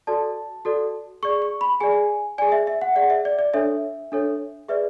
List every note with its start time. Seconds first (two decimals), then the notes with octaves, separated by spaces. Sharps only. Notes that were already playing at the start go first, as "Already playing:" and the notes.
0.07 F#4 A4 D5 A5
0.65 F#4 A4 D5
1.23 G#4 D5 C#6
1.42 C#6
1.61 B5
1.80 G#4 D5 G#5
2.38 G#4 D5 G#5
2.52 E5
2.67 E5
2.82 F#5
2.96 G#4 D5 F#5
3.10 E5
3.25 D5
3.39 D5
3.53 D4 A4 C#5 E5
4.12 D4 A4 C#5
4.68 G#4 B4 D5 E5